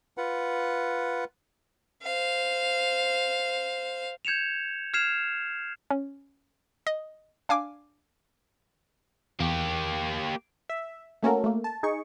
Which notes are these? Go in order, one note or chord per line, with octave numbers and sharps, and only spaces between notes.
F4 B4 F#5
C5 F5
G6 G#6 C#7 E7 F7
F6 G#6 C7 E7 F7
C#4
D#5
D4 F5 G#5 D6
E2 A#3 G4
E5
A3 A#3 C#4 F#4 A4 A#4
A3 A#3
A5
D#4 G#4 C#6